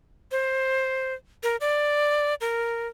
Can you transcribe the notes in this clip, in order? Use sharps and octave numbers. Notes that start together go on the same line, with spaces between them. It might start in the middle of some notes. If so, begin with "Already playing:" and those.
C5
A#4
D5
A#4